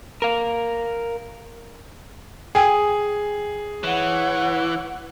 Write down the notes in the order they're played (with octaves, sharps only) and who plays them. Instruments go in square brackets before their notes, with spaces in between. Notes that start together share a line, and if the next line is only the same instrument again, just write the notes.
[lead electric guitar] A#4 F5
[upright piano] G#4 [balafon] G5 G#5
[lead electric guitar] E3 [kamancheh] C#5 F#5